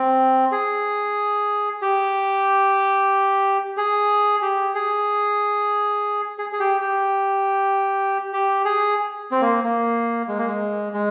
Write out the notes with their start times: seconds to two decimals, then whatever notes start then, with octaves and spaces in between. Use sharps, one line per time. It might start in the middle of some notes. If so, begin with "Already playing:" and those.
Already playing: C4
0.52 G#4
1.82 G4
3.77 G#4
4.42 G4
4.75 G#4
6.38 G#4
6.52 G#4
6.60 G4
6.81 G4
8.33 G4
8.65 G#4
9.31 C4
9.41 A#3
9.64 A#3
10.28 G#3
10.38 A#3
10.47 G#3
10.94 G#3